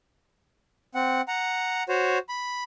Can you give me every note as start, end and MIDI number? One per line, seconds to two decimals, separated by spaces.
0.95 1.21 60
0.95 1.21 78
1.28 1.83 78
1.28 1.83 82
1.89 2.18 66
1.89 2.18 72
1.89 2.18 73
2.29 2.64 83